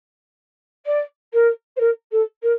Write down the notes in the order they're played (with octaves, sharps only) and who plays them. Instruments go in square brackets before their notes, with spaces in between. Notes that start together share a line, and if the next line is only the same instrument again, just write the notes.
[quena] D5
A#4
C5
A#4
A4
A#4